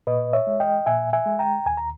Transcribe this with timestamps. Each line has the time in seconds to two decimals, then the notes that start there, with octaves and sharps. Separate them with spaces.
0.07 A#2 B4 D#5
0.33 C#5 E5
0.47 G#3
0.60 D#5 G5
0.86 A#2 E5 G#5
1.13 E5 G#5
1.26 G#3
1.39 G5 A#5
1.66 D#2 G#5
1.77 A#5